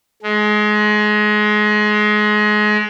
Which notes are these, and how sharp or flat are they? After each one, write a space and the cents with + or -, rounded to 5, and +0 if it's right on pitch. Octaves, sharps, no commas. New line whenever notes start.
G#3 +25